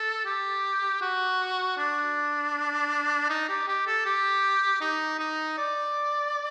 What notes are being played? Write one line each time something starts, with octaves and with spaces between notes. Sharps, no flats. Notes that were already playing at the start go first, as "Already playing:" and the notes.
Already playing: A4
G4
F#4
D4
D#4
G4
G4
A4
G4
D#4
D#4
D5